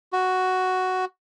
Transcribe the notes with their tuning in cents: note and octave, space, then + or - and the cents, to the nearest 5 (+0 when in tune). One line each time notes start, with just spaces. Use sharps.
F#4 +5